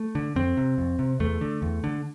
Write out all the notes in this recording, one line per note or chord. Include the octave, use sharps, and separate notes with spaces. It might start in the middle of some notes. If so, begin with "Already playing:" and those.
Already playing: A3
D3
F2 C4
C3
F2
C3
E2 A3
D3
E2
D3